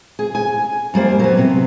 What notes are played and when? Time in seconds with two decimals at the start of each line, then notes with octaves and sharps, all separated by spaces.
0.19 G#4
0.35 G#5
0.94 F#2 G3 A#3 C5
1.19 F#3 B3
1.37 C3 B3